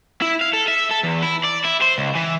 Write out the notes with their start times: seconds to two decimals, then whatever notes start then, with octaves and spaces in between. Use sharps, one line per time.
0.22 E4
0.41 F5
0.54 A4
0.68 E5
0.91 A4
1.04 E2
1.23 E4
1.44 D5
1.64 E4
1.81 C5
1.98 C#2
2.15 E3